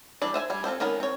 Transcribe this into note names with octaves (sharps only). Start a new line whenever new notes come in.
E3 G3 D4 D5
C5 E5 G#5
G3 G#5
C4 F4 A4 C5
D#3 G#3 B3 C#4 A#4
C4 C#5